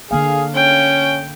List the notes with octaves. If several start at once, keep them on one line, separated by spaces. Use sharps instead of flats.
D3 A#3 G#4 F5
C#4 G5